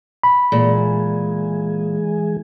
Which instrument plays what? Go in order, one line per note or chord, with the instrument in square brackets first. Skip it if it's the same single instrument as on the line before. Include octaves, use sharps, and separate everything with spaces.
[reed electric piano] B5
[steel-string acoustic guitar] A#2 [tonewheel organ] E3 G#3 G#4